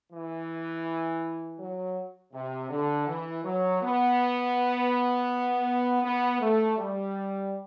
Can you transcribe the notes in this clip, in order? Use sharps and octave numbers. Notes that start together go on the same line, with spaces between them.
E3
F#3
C3
D3
E3
F#3
B3
B3
A3
G3